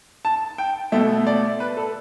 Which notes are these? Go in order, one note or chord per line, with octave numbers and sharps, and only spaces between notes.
A5
G5
B2 A3 E5
D5
B4
A4